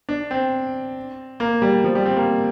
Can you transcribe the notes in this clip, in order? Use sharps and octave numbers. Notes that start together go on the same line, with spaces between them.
D4
C4
A#3
G3
F3
G3
C4
A#3